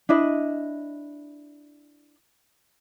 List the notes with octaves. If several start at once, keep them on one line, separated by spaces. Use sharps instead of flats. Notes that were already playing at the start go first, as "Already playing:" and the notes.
D4 E4 D#5